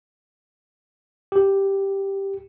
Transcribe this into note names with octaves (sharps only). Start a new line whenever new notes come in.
G4